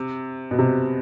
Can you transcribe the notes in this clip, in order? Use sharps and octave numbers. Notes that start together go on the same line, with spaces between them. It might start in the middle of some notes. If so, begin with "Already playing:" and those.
Already playing: C3
B2
C3